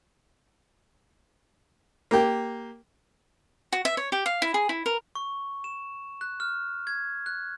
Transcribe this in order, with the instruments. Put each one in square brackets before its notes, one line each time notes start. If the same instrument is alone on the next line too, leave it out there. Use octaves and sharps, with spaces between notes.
[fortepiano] A#3 G4
[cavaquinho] F#4
E5
C#5
G4
F5
E4
G#4
E4
A#4
[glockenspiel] C#6
E7
F#6
F6
G#6
F#6